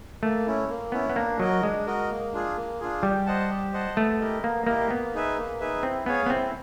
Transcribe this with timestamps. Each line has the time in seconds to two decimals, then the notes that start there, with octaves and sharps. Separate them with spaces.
0.23 A3 A#3
0.46 C#4 E4
0.69 A#3
0.92 B3 C#4 E4
1.09 B3
1.16 A#3 D4
1.40 F#3 F#4 A#4 D#5
1.63 G#3 D4
1.86 F#4 A#4 D#5
2.10 A#3
2.33 D4 F4 G#4
2.56 A#3
2.80 D4 F4 G#4
3.03 G3 G4
3.26 C5 D#5 F#5 A5
3.50 G4
3.73 C5 D#5 F#5 A5
3.97 A3 B3
4.20 E4 G4 A#4 D#5
4.44 A#3 B3
4.66 A#3 E4 G4 A#4 D#5
4.90 A#3 B3
5.14 D#4 G#4 B4 E5
5.37 A#3
5.60 D#4 G#4 B4 E5
5.83 C4 E4
6.06 B3 G#4 C#5 F5 G#5
6.26 B3
6.30 C4 E4